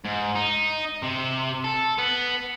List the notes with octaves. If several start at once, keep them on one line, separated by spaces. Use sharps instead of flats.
G#2
D#4
C3
A4
B3